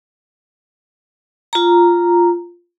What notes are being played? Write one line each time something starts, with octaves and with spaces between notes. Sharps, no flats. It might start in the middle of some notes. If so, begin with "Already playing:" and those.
F4 A#5